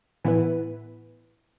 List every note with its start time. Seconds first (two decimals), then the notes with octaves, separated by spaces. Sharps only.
0.24 A2 E3 B3 E4 B4